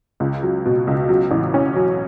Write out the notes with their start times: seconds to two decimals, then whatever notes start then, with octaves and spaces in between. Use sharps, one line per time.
0.20 C#2
0.43 F#3
0.66 B2
0.87 C#2
1.09 F#3
1.31 A1
1.54 C#4
1.76 F#3